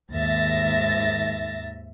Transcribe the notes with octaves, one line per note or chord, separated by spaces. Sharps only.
D#2 G#2 E5 A6 A#6